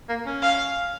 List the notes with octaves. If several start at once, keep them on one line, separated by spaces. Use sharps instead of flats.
A#3
C#4
F5